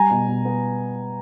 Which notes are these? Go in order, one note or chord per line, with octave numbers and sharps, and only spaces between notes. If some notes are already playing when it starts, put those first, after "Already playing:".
Already playing: G3 G#5 A#5
B2
B2
B3